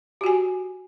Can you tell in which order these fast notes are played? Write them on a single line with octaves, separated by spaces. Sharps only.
G4 F#4 G#5